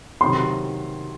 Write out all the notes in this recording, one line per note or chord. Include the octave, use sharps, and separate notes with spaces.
C3 D#3 F#3 C4 C6